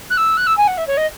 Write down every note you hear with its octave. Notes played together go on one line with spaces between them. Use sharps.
F#6
E6
F#6
E6
G#5
F#5
E5
C#5
D#5